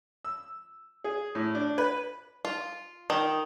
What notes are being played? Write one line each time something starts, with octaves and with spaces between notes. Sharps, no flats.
E6
G#4
A2
D4
B4
F4
D#3